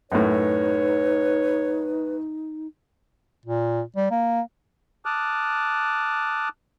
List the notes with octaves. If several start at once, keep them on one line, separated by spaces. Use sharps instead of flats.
F#2 A2 D#4 B4 C#5
A#2
G3
A#3
A5 D6 D#6 F6 F#6